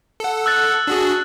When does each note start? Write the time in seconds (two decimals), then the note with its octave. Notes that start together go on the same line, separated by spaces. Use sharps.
0.20 A4 F#5
0.46 E6 F#6 A6
0.87 D4 F#4 G#4